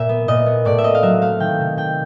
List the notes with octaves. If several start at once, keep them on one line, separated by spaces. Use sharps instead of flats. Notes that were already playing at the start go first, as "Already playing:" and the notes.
Already playing: A#2 E5
B3
A#2 D#5
B3
A2 D5
E5
C4 D#5
F5
F#3 E5
A3 F5
D#3 G5
C3
C3 G5